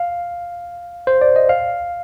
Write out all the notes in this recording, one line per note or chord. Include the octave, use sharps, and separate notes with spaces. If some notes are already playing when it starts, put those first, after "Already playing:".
Already playing: F5
C5
D5
D#5
F5